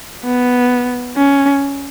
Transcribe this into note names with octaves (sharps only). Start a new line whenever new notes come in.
B3
C#4